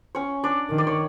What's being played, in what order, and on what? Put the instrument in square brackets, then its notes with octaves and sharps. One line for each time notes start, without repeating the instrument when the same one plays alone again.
[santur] C#4 C#5
D4 D5
[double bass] D#3
[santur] D5
C#5